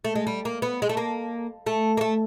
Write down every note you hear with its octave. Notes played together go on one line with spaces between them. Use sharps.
A3
G#3
G3
A#3
B3
G#3
A3
A#3
A3
A#3
A3